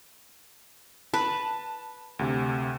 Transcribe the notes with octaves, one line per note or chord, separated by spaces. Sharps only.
B4 A5
D2 C3